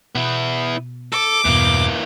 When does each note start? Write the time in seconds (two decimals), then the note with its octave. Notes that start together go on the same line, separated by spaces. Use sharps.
0.15 B2 B3 E4
1.12 A4 D6
1.45 E2 G2 B2 E3 A#3